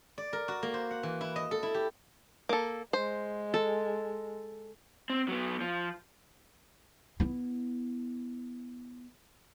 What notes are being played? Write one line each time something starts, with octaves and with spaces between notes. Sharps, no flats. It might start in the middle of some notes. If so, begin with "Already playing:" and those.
D5
A#4
F#4
A#3
C5
F#5
E3
E4
D#5
A4
E4
G4
A#3 A4
G#3 C5
A4
C4
F#3 B3
F3
B3 E4